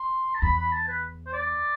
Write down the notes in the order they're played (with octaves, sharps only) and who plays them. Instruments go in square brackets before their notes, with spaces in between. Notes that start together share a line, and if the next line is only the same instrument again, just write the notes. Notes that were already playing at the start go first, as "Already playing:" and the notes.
Already playing: [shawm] C6
A5
[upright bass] E2 [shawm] B5
[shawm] B5
A5
B4
C5
D5